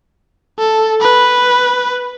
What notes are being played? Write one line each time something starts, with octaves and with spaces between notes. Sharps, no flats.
A4
B4